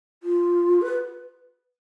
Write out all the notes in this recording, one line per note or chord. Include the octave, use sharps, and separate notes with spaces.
F4
B4